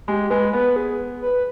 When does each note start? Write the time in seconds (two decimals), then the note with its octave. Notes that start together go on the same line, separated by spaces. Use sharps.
0.07 G#3 G4
0.30 G#3 B4
0.53 B3 B4
0.76 G#4
1.22 B4